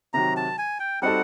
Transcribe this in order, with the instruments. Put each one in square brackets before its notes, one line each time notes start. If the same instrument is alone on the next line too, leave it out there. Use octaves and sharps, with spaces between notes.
[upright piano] C3 D#3 F#3 [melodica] A#5
[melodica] A5
G#5
G5
[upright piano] G3 C4 D#4 F#4 A4 [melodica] F#5